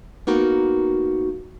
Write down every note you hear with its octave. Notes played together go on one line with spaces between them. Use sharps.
A#3 B3 D#4 F#4 A#4